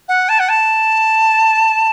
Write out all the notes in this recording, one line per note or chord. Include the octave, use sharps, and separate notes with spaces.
F#5
A5
F#5
A5